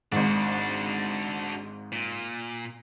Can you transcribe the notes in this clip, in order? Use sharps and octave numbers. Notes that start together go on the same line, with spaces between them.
G#1 G#2 D4 F#4
A#2